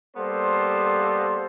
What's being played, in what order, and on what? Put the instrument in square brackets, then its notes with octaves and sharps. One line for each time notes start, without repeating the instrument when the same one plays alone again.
[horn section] G3 A#3 B3 A4 C5